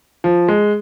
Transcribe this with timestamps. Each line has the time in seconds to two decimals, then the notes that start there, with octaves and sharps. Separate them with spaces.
0.24 F3
0.48 G#3